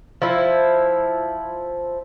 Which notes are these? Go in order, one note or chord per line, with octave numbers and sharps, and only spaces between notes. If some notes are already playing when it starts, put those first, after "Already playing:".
F3 E4